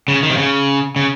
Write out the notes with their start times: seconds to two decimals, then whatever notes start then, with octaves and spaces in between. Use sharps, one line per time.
0.08 C#3
0.23 D#3
0.30 C3
0.37 C#3
0.96 C#3